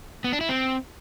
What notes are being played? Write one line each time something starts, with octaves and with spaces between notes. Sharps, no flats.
B3
D4
E4
C4